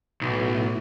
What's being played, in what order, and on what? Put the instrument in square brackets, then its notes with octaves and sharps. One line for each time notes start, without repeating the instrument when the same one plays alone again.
[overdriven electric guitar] B1 [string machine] A2 E4